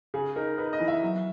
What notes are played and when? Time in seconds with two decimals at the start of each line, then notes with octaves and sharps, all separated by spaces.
0.14 C#3 G#4
0.36 D#4 A#4
0.58 D#4 B4
0.73 D#5
0.80 E3
0.88 E5
1.02 F#3